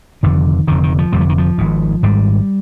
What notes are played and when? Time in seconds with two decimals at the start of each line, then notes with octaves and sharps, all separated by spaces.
0.23 F1 F2 D3 D#3
0.67 F1 F2 D3 D#3
0.83 D#3
0.98 F3
1.13 F1 F2 D3 G3
1.21 F3
1.29 D#3
1.38 F3
1.58 G#1 G#2
2.03 G#1 G#2 G3